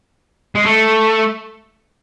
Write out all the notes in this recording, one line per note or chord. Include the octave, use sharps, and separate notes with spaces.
G#3
A3